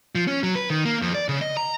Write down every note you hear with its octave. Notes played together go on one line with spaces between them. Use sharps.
F3
C#4
F#3
B4
D#3
A#3
F2
D5
C#3
D#5
A#5